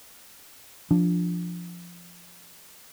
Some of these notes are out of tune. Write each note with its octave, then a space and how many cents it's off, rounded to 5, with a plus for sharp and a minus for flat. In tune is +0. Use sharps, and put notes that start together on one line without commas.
F3 +0 D4 +0